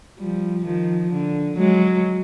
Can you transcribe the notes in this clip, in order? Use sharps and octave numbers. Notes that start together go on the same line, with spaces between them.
F3 G3
D#3 F3
D3
F#3 G#3